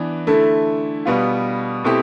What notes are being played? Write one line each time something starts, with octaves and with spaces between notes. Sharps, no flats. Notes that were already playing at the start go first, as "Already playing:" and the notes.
Already playing: E3 B3 D4
D3 A3 E4
B2 G3 B3 F4
B2 A3 C4 E4 G4